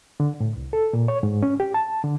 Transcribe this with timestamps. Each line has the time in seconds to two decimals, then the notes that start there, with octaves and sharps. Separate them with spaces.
0.20 D3
0.40 A2
0.56 C2
0.73 A4
0.93 A#2
1.08 C#5
1.23 G#2
1.43 C#4
1.60 G4
1.74 A5
2.04 D3